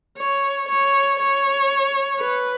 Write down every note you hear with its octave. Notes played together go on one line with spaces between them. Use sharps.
C#5
C#5
C#5
B4